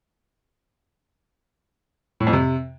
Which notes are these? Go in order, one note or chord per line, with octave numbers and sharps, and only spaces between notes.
A2
F2
C3